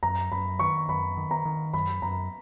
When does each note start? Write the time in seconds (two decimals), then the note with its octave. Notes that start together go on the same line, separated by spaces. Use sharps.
0.03 F#2 A#5
0.32 F#2 B5
0.59 D#3 C#6
0.89 F#2 B5
1.17 D#3
1.31 A#5
1.45 D#3
1.73 F#2 B5
2.02 F#2 A#5